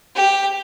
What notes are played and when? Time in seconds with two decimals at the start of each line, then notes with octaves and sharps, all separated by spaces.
0.15 G4